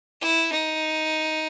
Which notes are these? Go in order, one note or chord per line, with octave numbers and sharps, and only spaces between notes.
E4
D#4